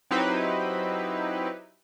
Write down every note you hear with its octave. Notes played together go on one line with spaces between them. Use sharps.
F#3 C4 D#4 E4 G4 B4